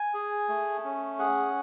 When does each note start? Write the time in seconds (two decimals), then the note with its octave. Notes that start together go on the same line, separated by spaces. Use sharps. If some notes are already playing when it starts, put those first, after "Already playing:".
Already playing: G#5
0.14 G#4
0.49 A3
0.84 C#4
1.19 G#4 F#5